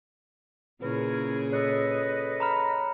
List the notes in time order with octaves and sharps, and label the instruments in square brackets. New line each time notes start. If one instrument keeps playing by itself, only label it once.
[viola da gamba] A#2 C#3 G#4 [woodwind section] E4 A#4 C#5 [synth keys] B4
[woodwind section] A4 B4 D#5 [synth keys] C#5 F#6 C#7
[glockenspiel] A#5 B5 F6